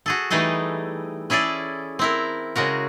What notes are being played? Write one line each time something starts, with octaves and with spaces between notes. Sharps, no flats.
F#4 G#4 A4
E3 G3 A3 D#4 G#4 A4
C#4 E4 G#4 A4 D5
C4 E4 A#4
C#3 G#3 F#4 A#4